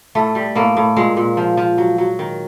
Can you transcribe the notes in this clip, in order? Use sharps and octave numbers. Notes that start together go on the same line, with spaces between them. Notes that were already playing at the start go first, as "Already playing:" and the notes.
A2 A3
G3
A2 A#3
A2
A#2 G#3
A#2
F3
F3
F#3
F#3
D#3